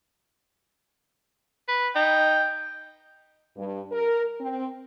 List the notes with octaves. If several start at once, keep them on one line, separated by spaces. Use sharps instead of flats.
B4
D#4 G5
G2
A#4
C4